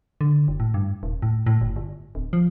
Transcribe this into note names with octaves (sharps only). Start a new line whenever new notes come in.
D3
F#1
A2
G2
D#1
A2
A2
F#1
G1
D1
F3